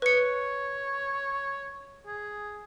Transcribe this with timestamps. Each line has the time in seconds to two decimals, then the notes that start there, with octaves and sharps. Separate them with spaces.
0.02 B4 C#5 C#7
2.06 G#4